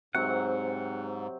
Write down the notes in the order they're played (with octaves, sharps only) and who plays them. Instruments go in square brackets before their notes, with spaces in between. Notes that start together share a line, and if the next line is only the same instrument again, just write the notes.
[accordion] G#2 [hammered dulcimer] C3 F#3 C4 [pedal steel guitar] F#5